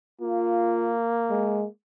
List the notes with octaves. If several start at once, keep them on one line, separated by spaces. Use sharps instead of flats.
A#3 F4
G#3